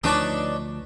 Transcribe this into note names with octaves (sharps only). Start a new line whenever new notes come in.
D2 F3 D4 D#4 B4 C#5 D5 A5